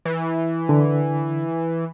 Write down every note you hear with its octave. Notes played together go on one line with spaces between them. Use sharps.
E3
D3